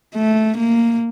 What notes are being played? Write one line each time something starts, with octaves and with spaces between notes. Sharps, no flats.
A3
A#3